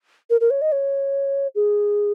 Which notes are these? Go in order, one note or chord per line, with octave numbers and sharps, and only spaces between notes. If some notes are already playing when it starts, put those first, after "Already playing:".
A#4
A#4
C#5
D#5
C#5
G#4